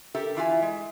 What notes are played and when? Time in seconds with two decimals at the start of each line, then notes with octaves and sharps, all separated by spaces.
0.15 G4 A4 A#4 E5
0.36 E3 E4 F4 E5 F#5 G#5
0.62 G#3